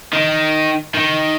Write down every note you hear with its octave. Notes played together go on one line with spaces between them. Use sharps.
D#3
D#3